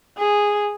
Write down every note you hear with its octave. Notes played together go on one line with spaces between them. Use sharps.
G#4